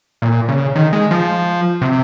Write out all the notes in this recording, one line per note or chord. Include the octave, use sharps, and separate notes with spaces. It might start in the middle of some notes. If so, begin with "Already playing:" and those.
A#2
C#3
D#3
G#3
F3
C3